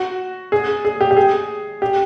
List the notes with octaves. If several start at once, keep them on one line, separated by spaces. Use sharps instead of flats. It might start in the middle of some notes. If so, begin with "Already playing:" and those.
Already playing: F#4
G#4
G#4
G4
G4
G#4
G4